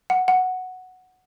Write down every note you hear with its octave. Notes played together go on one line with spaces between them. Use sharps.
F#5
F#5